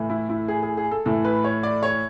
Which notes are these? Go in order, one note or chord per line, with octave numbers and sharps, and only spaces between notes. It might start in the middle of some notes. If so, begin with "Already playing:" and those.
Already playing: A2 E3
E4
E4
G#4
G#4
G#4
A4
A2 E3 A4
B4
C#5
D5
C#5